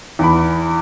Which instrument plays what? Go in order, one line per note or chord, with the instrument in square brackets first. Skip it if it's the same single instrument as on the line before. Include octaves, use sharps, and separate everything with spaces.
[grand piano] E2 B5